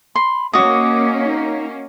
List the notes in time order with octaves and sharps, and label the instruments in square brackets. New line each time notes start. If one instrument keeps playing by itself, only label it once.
[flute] B5 [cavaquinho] C6
[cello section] A#3 C#4 [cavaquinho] F#4 D#5 [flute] D6
[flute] D#4